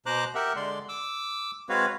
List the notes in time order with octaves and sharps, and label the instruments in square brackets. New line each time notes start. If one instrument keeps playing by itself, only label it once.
[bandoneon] B2 C5 A#5 D6 F#6
G4 A#4 E5 F#5
D3 G#3 D5 C6
D6 E6
G#3 C4 F#4 B4 C#5 F5